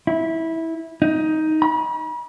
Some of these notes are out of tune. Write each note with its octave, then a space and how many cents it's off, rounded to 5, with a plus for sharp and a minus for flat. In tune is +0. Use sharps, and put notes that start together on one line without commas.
E4 -15
D#4 +10
B5 -45